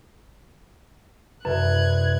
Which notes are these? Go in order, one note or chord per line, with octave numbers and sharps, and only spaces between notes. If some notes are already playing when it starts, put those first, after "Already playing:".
C2 F#2 B4 F#6 G#6